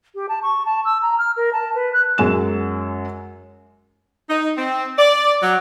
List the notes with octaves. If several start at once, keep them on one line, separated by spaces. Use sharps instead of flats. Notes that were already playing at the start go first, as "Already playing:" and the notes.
G4
A5
C#6
A5
E6
A#5
F6
A#4
A5
B4
F#6
F#2 F#3 G#3 G#4 E7
D#4
C4
D5
F#3